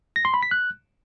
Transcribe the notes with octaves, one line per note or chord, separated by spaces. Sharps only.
A#6
C6
B5
B6
F#6